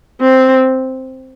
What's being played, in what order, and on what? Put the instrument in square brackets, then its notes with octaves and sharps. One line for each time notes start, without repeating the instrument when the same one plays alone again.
[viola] C4